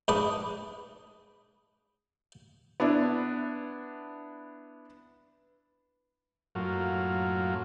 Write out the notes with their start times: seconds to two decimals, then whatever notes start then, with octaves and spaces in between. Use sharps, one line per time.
0.08 G#2 D4 B4 D#6
2.80 B3 D4 E4
6.55 F#2 A2 F#3 A#3 F4